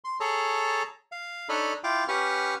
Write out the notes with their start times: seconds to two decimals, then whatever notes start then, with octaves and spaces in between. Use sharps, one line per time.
0.04 C6
0.20 G#4 A4 C#5 A5 A#5
1.12 F5
1.49 D4 D#4 A4 C#5 D#5 B5
1.84 E4 F4 F5 G5 D6
2.08 C#4 G4 B4 F#5 C#6 F6